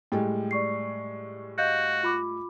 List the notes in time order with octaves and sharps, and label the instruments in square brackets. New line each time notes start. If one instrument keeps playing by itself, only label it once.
[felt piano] A2 G3 G#3 [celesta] G5
[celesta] D5 C#6 C7
[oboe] F#4 [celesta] D#5 F5 G6
[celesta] F4 B5 D6